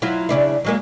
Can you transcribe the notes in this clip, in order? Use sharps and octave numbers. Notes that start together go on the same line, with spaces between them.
F#3 E4 F4
C#3 D4 E4
F#3 G#3 A#3